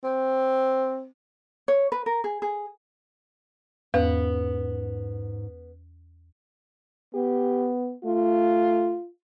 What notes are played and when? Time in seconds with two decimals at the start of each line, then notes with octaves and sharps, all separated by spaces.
0.04 C4
1.68 C#5
1.92 B4
2.06 A#4
2.24 G#4
2.42 G#4
3.94 E2 G#2 B3
7.15 B3 G4
8.05 A3 F4